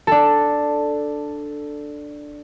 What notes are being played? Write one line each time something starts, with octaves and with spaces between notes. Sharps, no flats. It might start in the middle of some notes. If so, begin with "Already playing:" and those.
D4 A4